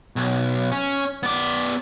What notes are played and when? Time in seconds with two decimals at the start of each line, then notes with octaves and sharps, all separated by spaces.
0.16 B1
0.71 C#4
1.23 B3 D5